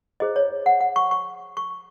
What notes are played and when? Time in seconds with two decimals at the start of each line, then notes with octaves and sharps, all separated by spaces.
0.20 E4 G#4 C5 D#5
0.36 C#5
0.66 F#5
0.81 F#5
0.96 C#6
1.11 C#6
1.57 C#6